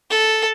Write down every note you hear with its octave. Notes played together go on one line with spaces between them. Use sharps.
A4